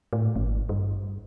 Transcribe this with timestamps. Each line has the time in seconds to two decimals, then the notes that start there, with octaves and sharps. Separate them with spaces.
0.13 A2
0.36 G#1
0.69 G2